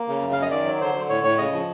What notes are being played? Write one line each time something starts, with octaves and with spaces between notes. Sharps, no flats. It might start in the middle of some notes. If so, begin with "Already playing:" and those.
Already playing: A#3
C#3
F#2
F5
F#2
D#5
D#3 D5
F#3
D3 C5
D3
A2 C#5
A2 C#5
C#3 D#5
F3